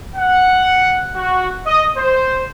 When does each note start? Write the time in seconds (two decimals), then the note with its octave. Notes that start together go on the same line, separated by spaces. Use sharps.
0.16 F#5
1.15 F#4
1.65 D#5
1.96 C5